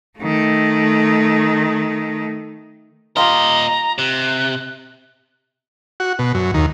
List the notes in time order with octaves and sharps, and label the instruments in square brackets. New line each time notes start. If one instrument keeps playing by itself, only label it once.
[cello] D#3 A3
[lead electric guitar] A#2 D#5 [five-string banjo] F4 G4 [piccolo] A#5
[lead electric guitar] C3 [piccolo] F#6
[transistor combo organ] F#4
B2
F#2
D#2